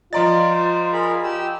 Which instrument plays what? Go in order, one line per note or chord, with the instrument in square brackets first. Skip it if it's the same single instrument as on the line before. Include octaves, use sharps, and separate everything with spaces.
[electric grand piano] F3 D5 A6 [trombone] F4 [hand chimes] D#5 A#5 C6
[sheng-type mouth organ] C5
G#4 A#4 B5
G4 E6